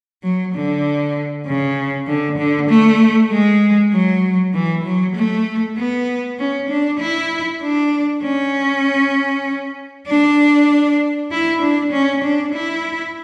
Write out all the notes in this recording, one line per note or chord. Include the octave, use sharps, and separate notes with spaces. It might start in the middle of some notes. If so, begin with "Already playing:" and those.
F#3
D3
C#3
D3
D3
A3
G#3
F#3
E3
F#3
A3
B3
C#4
D4
E4
D4
C#4
D4
E4
D4
C#4
D4
E4